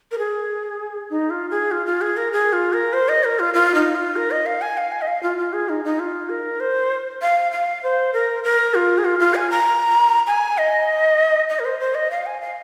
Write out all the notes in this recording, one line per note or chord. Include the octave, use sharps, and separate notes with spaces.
A#4
G#4
D#4
F4
G#4
F4
F4
G#4
A#4
G#4
F4
A#4
C5
D#5
A#4
F4
F4
D#4
F4
A#4
D#5
F5
G#5
F5
G#5
D#5
F5
F4
F4
G#4
D#4
D#4
F4
A#4
C5
F5
F5
C5
A#4
A#4
F4
G#4
F4
F4
G#5
A#5
G#5
D#5
D#5
A#4
C5
C5
D#5
F5
G#5
F5